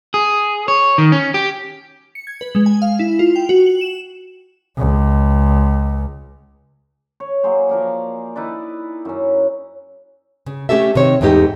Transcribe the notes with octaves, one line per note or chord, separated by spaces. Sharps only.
G#4
C#5
D#3
C#4
G4
C#7
G#6
B4
G#3
G#5
F5
E4
F4
G5
F#4
F#7
E7
C#2
C#5
F#3 A#3 G#4 C5
F3 A#4 D5
D#4 E4 B4 D5
F#2 C#4
C#3
A3 C#4 G4 A4 E5
C3 D#3 C#5
E2 G#2 A3 D#4 G4